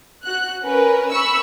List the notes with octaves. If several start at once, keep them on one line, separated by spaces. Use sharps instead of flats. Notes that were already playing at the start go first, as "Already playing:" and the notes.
F#4 F#6
C#4 A#4 B4
B5 C#6 E6